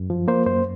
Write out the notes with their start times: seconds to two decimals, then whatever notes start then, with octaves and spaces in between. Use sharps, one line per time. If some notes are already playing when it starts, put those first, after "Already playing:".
Already playing: F#2
0.10 F3
0.28 A#3 C5
0.46 F#2 C5